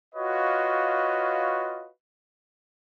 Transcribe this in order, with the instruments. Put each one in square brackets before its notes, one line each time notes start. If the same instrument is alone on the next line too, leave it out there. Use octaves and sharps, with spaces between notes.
[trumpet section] F4 F#4 B4 C#5 D#5 F5